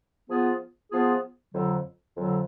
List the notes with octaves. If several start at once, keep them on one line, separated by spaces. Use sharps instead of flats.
F3 B3 F4 G#4
F3 B3 F4 G#4
F2 D3 F#3
F2 D3 F#3